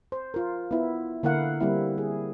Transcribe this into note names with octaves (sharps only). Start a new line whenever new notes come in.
C5
F4 A#4
B3 E4
D3 A#3 E4 A#4 F5 F#5
G3 A#3 C4 E4
G#4